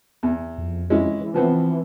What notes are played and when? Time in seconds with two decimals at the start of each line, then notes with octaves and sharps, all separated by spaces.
0.23 E2
0.58 F2
0.90 G#3 C#4 E4
1.21 E3
1.34 F3 B3 C4